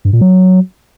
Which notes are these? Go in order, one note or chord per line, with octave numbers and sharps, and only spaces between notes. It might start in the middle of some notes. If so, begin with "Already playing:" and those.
G2
A#2
F#3